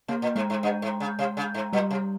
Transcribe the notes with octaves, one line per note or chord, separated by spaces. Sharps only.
C3 A#3
A#2
G#2 G#3
G#2
G2
G#2
C#3
C3
C#3
G#2
A#2 G3
C3